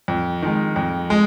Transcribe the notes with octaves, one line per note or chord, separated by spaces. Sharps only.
F2
D#3 G#3
F2
G#3